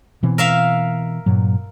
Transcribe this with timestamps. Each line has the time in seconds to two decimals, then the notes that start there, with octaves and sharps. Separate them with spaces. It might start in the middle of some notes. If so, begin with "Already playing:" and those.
0.23 B2 E3 C4
0.38 A#4 E5 F5
1.26 G2 A#2 F#3